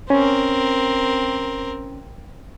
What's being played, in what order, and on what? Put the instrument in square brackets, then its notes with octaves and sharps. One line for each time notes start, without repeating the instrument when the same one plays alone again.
[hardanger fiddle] C4 A#4 [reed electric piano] C#4